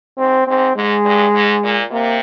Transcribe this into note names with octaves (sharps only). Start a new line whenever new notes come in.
G#2 C4
G#2 C4
G#2 G#3
G2
G#2
A#2
C3 A#3